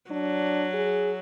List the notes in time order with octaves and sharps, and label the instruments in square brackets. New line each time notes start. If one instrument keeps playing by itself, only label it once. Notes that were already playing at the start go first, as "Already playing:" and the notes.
[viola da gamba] F#3 [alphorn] D4
[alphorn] G#4